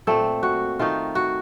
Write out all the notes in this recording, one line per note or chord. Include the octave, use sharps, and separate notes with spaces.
A#2 A3 C4 A4
F#4
D#3 A3 D#4 F4
F#4